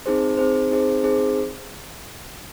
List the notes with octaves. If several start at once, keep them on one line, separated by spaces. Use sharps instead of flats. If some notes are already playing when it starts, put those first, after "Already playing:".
C4 D#4 G#4 C5
C4 D#4 G#4 C5
C4 D#4 G#4 C5
C4 D#4 G#4 C5